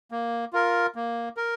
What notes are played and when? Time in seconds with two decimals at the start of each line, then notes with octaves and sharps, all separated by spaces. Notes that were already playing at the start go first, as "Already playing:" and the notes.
0.11 A#3
0.53 F4 A#4
0.95 A#3
1.37 A#4